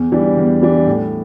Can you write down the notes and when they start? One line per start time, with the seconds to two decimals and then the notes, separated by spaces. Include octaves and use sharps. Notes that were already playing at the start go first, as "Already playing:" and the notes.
Already playing: E2
0.12 E3 G3 D4
0.37 E2
0.62 E3 G3 D4
0.87 A2